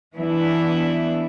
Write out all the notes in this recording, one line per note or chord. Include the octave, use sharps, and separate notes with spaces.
E3 B3 D4 E4